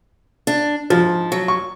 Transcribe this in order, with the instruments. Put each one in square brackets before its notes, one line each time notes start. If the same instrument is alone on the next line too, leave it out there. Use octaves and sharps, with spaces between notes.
[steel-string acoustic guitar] D4
[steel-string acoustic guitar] G#2 [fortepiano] F3
[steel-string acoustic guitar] F#3
[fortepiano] C#6